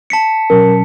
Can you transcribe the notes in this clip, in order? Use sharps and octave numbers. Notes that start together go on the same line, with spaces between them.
A5 B6 C#7
B2 F#3 C#4 A#4